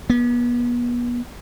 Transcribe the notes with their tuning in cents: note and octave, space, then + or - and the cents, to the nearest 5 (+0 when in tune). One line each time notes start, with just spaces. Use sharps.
B3 -35